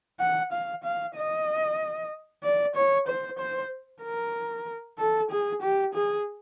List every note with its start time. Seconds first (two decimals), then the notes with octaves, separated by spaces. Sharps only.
0.20 F#5
0.52 F5
0.84 F5
1.16 D#5
2.43 D5
2.75 C#5
3.08 C5
3.39 C5
4.03 A#4
4.99 A4
5.31 G#4
5.62 G4
5.94 G#4